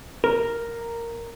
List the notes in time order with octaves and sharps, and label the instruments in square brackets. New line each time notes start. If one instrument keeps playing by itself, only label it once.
[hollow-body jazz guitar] A#4